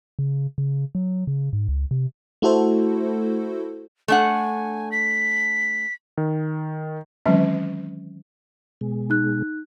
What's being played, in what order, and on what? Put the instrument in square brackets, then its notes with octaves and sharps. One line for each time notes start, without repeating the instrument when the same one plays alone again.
[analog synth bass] C#3
C#3
F#3
C#3
G#2
C#2
C3
[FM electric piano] A3 E4 F#4 A4 C5
[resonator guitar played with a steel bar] A3 D4 F#5 [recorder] G#5
[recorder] B6
[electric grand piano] D#3
[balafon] D#3 E3 F#3 G#3 C4 C#4
[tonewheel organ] B2 G#3
[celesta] D#4 F#6